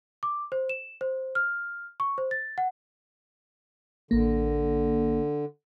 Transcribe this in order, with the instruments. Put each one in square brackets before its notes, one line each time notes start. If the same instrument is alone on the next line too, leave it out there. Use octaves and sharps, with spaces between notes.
[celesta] D6
C5
E7
C5
F6
C#6
C5
A6
F#5
[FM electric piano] A1 A#3 [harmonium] D3